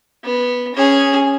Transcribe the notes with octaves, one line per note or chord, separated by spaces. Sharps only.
B3
C#4 G#4